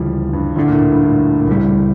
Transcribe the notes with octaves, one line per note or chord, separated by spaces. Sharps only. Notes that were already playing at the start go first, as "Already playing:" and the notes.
Already playing: D2 C#3 E3 F3 G3
G2
D2 A2 D3 G3 D4
A#2
A2
A#2
G2
A2
A#2
C#2 A2 C#3 G3